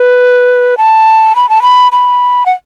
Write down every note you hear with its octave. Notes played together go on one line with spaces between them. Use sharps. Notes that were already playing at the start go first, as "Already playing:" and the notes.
Already playing: B4
A5
B5
A5
B5
B5
F#5